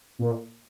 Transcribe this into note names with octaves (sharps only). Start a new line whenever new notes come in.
A#2